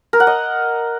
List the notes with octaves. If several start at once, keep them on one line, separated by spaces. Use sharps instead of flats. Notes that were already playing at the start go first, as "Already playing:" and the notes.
A#4
F#5
D#5